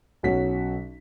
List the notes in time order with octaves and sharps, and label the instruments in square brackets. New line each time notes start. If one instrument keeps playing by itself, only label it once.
[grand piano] B1 F#3 C#4 F#4 B6